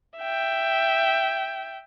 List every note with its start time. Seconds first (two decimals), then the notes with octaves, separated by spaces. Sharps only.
0.18 E5 G5